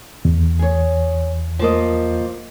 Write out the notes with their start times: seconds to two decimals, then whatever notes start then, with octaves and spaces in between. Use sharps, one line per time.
0.25 E2
0.59 G#4 C#5
1.59 F3 A#3 D#5